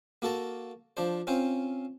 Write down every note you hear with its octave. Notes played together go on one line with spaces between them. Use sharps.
A#3 F#4 A4 A5 A#5
F3 D4 C5
C4 C#4 F4 C5